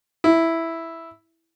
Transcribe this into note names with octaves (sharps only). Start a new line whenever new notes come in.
E4